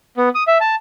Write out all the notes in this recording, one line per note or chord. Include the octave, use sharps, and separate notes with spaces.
B3
D#6
E5
A5